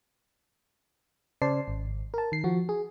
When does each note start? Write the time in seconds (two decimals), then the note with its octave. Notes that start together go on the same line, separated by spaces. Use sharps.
1.42 C#3 C5 D5 A5 C7
1.68 G#1
2.14 A#4 A5
2.32 D#3 C7
2.44 F3 F#4
2.69 G#4